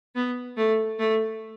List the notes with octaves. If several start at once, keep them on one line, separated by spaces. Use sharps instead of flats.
B3
A3
A3